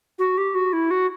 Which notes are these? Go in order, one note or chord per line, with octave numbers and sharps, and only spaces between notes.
F#4
G4
F#4
E4
F#4